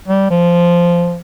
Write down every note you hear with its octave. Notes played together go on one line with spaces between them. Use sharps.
G3
F3